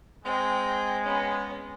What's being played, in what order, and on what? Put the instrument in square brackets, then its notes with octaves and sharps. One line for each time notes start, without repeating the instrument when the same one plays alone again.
[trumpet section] G#3 [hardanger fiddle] C4 G5
[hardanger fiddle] B3 C#4